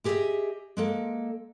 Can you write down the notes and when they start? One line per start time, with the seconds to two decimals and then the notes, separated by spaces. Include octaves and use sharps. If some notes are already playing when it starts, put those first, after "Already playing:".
0.04 E4 G4 G#4 B4 D#5 E5
0.77 G#3 A#3 A4